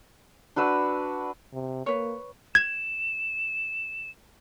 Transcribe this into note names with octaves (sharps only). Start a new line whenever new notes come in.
D4 F#4 B4 E6
C3
A#3 B4 C#5
G#6 E7